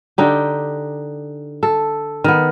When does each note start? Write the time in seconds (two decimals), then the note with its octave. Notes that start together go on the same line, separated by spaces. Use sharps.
0.18 D3 D#4 G4
1.63 A4
2.24 D#3 B3